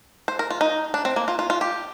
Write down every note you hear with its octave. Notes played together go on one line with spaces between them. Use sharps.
C5
A#4
F4
D#4
D4
C4
A#3
F4
F4
F4
G4